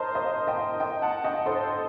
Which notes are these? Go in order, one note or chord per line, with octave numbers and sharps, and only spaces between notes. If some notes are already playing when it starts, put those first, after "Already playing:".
Already playing: A#4 C5 D#5 A5 C6
C5 D#5
D#5 G5
D#5 G5
F#5 A5
D#5 G5
A4 C5